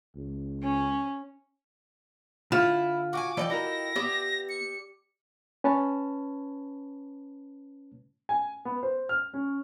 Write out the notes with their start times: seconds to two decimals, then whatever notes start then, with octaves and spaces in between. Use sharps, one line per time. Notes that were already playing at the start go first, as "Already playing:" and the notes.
0.16 C#2
0.61 C#4
2.52 D3 E4 F4
3.13 F#4 G5 G#5 D6
3.37 E3 F3 A4 D5 D#5 G5
3.50 E4 F#4 A#4 A#6
3.96 B3 G4 D5 E5
4.49 C#7
5.64 C#4 B4 C#5 A5
8.29 G#5
8.65 B3
8.83 C5
9.09 F6
9.34 C#4